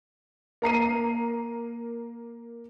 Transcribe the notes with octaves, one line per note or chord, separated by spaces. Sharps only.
A#3 A#5 C7 D#7